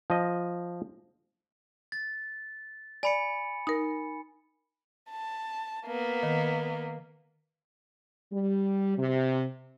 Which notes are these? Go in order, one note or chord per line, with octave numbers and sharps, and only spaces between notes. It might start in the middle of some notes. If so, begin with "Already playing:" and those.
F3 D#5
A6
D5 G#5 B5 C#7
D#4 A#4
A5
A#3 B3
D#3
G3
C3